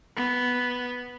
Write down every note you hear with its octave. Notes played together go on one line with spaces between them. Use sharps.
B3